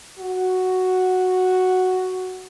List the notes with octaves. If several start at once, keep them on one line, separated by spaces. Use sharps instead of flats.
F#4